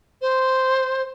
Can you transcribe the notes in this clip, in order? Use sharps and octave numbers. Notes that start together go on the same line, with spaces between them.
C5